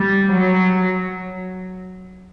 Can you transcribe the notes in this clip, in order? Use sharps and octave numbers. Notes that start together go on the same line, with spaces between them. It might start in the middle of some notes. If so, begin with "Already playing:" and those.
Already playing: G3
F#3